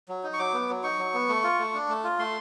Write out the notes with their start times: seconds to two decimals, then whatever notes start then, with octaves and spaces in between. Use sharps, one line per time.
0.09 F#3
0.24 D#4
0.33 C#6
0.39 F#3 D6
0.54 B3
0.69 F#3
0.83 D#4 C#6
0.98 F#3
1.14 B3
1.29 A3
1.44 F4
1.59 A3
1.74 D4
1.89 A3
2.04 F4
2.19 A3 C6